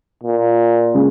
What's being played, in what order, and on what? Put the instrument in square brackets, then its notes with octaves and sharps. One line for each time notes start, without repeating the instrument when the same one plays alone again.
[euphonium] A#2
[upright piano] C#3 G#3